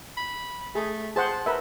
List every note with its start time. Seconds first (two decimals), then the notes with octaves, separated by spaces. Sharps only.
0.17 B5
0.75 A3 G#4
1.16 G#4 C5 F#5 A5
1.46 A#4 B4 E5